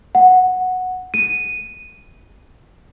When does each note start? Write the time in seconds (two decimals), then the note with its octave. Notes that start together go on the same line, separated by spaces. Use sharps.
0.15 F#5
1.14 D#7